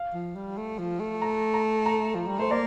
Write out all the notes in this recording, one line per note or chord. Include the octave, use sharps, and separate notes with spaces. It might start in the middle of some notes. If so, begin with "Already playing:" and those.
Already playing: F5
F3
G3
A3
F3
A3
A#5
A#5
A#5
F3
G3
A3 C5
A#3 D5